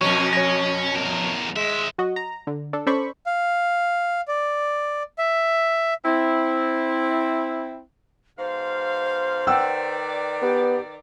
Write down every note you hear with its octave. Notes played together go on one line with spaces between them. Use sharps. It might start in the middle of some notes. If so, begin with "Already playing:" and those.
F2 B2 F#3 C#4 C#6
C#5 A#6
E2 A#4
D#2 G#3 E5
F#3 F#4 D#5
A#5
D3
D4 A4
C#4 A4 C5 D5 B5 C#6
F5
D5
E5
C4 E4
G#2 B2 C5 F5
D#3 B4 D5 F#5 G5 E6
B3 G4